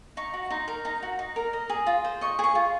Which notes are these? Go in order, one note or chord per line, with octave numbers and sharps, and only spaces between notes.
D#4 C#6
F#4
D#4 C6
A#4
D#4 A#5
F#4
D#4
A#4
D#5
G#4
F4
C5
D#5 C#6
G#4 C#6
F4